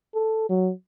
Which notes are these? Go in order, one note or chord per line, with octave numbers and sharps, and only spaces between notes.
A4
F#3